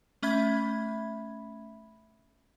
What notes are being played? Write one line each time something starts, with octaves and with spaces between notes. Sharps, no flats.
A3 C#4 E5 B5 G#6